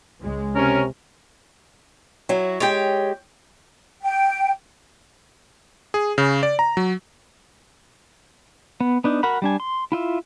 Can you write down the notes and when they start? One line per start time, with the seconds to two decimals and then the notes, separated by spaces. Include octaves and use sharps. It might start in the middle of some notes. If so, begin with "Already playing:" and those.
0.21 C#2 G#3
0.55 C3 C#4 A#4
2.29 F#3 E4 F#4
2.60 G#3 G4 C#5 G5
4.02 G5
5.94 G#4
6.18 C#3
6.43 D5
6.59 A#5
6.77 F#3
8.80 B3
9.04 B3 D4 D#4
9.23 F#4 A#4 F#5 B5
9.42 G3 D4 G#5
9.60 C6
9.92 E4 F4 E5